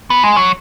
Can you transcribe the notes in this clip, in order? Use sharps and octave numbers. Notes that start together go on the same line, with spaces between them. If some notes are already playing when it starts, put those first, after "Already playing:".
B3
G#3
F#3